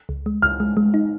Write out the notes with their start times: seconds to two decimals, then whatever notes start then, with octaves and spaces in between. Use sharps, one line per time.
0.09 C#2
0.26 G#3
0.42 C#2 F6
0.60 G#3
0.77 G#3
0.94 D#4